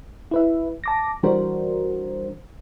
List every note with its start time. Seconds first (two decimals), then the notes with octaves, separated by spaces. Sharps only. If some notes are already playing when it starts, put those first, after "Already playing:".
0.31 E4 B4 E5
0.84 A5 D6 A#6
1.23 E3 G3 D4 F#4 A#4 C5